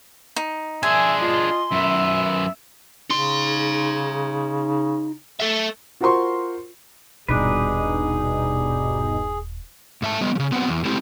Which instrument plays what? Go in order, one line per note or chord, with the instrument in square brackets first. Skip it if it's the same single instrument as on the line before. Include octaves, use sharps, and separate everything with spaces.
[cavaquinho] D#4
[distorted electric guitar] D4 G#4 [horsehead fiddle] E5 [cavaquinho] G#5 [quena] C6
[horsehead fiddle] F4 D#5
[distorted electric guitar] F#2 B3 [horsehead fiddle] E5
[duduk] C#3 [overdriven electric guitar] D#4 C6
[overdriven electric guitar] A4 E5
[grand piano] F4 F#4 A#4 C5 C6 C#6
[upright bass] D#1 [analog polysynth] G2 B2 D#4 [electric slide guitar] D4 B4 [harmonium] G#4
[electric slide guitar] G#2 E5 A5
G3 B3 D#5
C#3 F3
F#3 B3 C4 B4 F#5
E2
G#3 A3 C4 E4 G4 A4